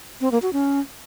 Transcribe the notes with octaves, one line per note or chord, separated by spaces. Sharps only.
C4
A#3
F#4
C#4